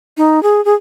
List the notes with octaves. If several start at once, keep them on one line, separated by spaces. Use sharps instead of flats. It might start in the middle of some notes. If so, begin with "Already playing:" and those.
D#4
G#4
G#4